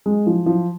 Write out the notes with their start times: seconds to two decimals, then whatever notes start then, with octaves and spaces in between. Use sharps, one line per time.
0.06 G#3
0.27 F3
0.46 F3